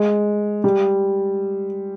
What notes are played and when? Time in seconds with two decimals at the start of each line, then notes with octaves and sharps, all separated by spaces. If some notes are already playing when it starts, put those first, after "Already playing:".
Already playing: G#3
0.64 G3